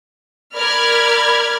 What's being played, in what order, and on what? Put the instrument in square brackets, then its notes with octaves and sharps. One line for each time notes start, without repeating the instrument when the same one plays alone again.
[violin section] A#4 D5 B5 F6 G#6